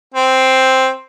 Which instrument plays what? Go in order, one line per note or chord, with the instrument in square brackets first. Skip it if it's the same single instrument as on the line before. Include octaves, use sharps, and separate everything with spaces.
[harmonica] C4